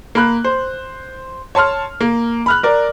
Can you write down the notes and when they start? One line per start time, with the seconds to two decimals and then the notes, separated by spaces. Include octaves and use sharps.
0.15 A#3 B5 F#6
0.45 C5
1.55 C#5 A5 C6 F6
2.01 A#3
2.46 B5 F6 F#6
2.63 A#4 D5